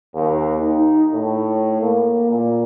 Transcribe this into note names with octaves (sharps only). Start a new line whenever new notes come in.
D#2
D#4
A2
A#3
A#2